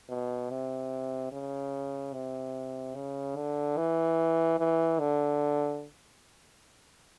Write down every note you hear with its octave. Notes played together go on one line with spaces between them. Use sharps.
B2
C3
C#3
C3
C#3
D3
E3
E3
D3